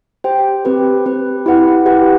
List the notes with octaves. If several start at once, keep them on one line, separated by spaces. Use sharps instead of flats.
G4 C5 G5
C4 G4 B4
C4 G4 B4
E4 G4 B4 F#5
E4 G4 B4 F#5